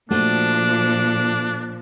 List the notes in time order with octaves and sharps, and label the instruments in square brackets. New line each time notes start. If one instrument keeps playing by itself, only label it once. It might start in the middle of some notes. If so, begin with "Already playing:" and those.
[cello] A#2 F3 [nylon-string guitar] A3 F#4 C5 [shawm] D4